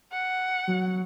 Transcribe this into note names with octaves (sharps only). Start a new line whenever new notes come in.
F#5
F#3